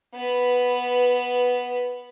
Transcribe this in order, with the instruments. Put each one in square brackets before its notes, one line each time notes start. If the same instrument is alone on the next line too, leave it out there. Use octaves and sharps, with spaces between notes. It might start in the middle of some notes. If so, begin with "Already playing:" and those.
[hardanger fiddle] B3 B4